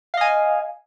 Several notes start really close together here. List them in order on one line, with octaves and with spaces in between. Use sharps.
F5 D#5 G#5